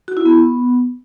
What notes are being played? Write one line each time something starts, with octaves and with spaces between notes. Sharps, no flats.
F#4
E4
B3